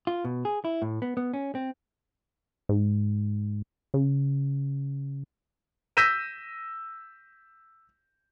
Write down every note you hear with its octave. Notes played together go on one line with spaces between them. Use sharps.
F4
B2
G#4
E4
A2
B3
B3
C#4
C4
G#2
C#3
E6 G6 A#6 B6 D#7 E7